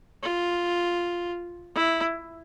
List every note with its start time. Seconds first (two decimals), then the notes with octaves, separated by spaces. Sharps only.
0.23 F4
1.75 E4